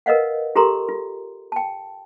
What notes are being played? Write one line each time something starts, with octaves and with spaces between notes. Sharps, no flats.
A#4 B4 D#5 F5 F#5
F4 G4 A4 A#4 A#5 C6
F4
G5 A5